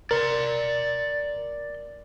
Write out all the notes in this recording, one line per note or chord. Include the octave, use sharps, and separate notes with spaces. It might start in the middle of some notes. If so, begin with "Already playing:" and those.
A#4 D5 C6